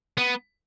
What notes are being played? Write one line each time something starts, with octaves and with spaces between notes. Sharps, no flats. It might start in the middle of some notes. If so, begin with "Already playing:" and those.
B3